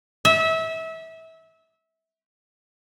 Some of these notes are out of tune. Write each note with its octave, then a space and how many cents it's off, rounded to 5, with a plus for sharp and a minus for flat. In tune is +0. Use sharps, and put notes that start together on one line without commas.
E5 -25